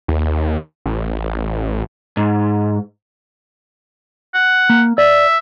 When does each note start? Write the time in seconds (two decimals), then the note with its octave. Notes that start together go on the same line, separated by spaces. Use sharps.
0.08 D#2
0.86 A1
2.17 G#2
4.34 F#5
4.69 A#3
4.98 D5 E5